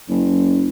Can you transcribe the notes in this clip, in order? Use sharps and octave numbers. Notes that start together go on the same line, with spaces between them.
F#1